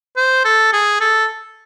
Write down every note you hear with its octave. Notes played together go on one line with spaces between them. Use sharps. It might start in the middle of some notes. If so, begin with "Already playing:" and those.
C5
A4
G#4
A4